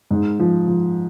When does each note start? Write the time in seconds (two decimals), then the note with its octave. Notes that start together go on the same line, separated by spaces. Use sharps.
0.11 G#2
0.39 F3
0.67 F3